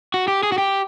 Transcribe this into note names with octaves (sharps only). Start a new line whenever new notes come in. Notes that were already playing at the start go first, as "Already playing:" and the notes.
F#4
G4
G#4
F#4
G4